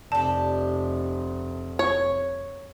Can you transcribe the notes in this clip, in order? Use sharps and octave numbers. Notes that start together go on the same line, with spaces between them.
F1 D4 G4 A5
C#5